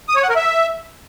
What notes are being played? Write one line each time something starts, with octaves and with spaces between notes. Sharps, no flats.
D#6
C#5
F#5
A#4
E5